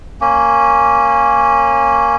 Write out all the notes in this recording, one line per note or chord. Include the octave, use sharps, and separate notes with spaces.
A#3 C#4